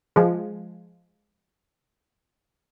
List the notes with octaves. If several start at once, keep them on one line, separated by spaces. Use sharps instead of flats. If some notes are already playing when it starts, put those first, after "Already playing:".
F3 G#3